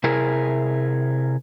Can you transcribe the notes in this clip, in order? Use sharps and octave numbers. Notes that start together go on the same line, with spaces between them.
C3 E4 G#4 A#4